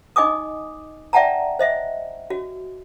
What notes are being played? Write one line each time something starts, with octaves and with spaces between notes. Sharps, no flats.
D#4 D#5 G#5 D6 D#6
D5 E5 F#5 G5 A5 A#5
C5 D#5 E5
F#4